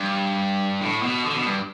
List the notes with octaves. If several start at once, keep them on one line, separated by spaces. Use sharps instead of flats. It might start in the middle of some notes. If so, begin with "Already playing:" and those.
Already playing: G2
A2
B2
D3
B2
G2